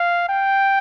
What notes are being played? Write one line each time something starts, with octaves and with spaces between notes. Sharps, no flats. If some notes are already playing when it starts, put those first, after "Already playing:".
Already playing: F5
G5